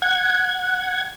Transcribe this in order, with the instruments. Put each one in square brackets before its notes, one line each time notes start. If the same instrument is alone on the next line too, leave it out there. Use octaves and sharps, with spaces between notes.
[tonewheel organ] F#5 G#6